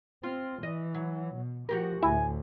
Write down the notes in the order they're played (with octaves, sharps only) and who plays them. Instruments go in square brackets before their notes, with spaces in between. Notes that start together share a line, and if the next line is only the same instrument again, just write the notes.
[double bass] C4 [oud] F4
[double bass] E3 [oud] D#5
[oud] F#3
[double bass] B2
[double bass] F3 [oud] F#4 G4 A#4
[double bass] D2 A2 [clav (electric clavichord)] E4 E5 [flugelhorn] G#5